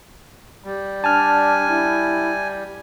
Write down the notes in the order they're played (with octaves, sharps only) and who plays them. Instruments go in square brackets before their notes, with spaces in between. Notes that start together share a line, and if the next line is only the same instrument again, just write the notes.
[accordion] G3
[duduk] D4 [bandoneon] G#5 [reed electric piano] A5 F6
[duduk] E4